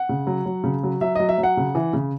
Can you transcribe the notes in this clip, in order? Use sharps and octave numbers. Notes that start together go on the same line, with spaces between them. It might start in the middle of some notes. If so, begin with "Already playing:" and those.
Already playing: F#5
C#3
F#3
F#3
C#3
F#3
F#3 E5
F#3 D#5
E5
F#3
F#5
C#3
E3
C#3